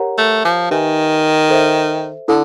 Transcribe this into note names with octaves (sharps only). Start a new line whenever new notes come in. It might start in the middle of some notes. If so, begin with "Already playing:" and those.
Already playing: G4 A#4 C#5 F#5 A#5
A3
F3
D#3 D#4 G4 B4 E5 G#5
A4 C5 E5
D3 E4 A4